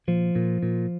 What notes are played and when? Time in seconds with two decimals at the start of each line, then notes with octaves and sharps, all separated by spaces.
0.08 A#2 F3
0.35 A#2
0.63 A#2